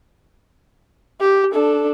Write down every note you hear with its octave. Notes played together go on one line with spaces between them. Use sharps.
G4
D4 A4